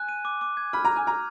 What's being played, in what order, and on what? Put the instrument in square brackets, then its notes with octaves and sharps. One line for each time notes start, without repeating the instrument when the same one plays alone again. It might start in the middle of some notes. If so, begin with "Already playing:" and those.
Already playing: [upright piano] G#5 [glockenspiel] F#6
[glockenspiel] D#7
D6
D6
G#6
[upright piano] B5 [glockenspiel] F6
[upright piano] A#5
[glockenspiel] F6
[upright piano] G#5
[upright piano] A#5 [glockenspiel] F6